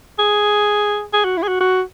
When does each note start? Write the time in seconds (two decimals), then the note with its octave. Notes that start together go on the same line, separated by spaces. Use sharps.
0.19 G#4
1.13 G#4
1.24 F#4
1.37 E4
1.43 G#4
1.48 F#4
1.60 F#4